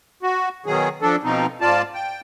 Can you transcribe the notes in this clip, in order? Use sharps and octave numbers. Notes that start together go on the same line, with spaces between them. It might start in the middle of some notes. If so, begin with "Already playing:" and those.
F#4
B2 D#3 F#3 G#4
F3 D4 A4
B2 F3 C4 D#4
G#2 F4 D5 A5
G5